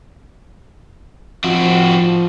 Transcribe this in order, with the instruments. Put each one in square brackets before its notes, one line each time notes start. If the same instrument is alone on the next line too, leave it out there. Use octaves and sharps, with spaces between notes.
[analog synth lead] F3 [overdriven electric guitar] C4 F#4